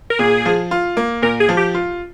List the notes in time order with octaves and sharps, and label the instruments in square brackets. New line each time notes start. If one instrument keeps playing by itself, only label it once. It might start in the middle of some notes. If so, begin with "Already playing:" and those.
[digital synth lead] A#4
[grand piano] A#2 [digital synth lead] G#4
[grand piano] F3
F4
A#3
[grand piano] A#2 [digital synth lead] A#4
[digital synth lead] G#4
[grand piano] F3
[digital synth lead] G4
[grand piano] F4